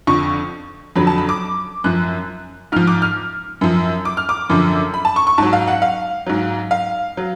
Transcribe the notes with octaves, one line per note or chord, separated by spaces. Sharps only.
F2 D3 F3 C#6
F2 D3 F#3 B5
A5
B5
D6
F#2 F3 F#6
G#2 F3 F6
D6
F6
F#2 F3
D6
F6
D6
F#2 D3 F3
B5
A5
C#6
C#6
G#2 F#3 A5
F5
F#5
F5
G#2 F#3
F5
F#3